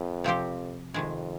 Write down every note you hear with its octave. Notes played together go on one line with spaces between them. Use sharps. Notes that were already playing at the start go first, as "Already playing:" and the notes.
Already playing: F2
C3 F3 C4 G4
F2 C3 D#3 G#3